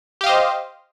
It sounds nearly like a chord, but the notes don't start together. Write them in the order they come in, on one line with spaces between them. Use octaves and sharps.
G4 F5 D#5 C5